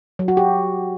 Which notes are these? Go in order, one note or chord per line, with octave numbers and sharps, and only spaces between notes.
F#3
F#4
G4